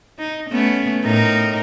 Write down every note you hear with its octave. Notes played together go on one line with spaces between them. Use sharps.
D#4
A3 B3 C#4
A2 D#4 A#4